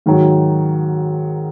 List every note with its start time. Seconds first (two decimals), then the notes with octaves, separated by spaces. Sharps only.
0.06 G#2 D#3 F#3